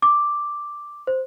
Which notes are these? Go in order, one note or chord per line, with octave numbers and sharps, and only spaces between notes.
D6
C5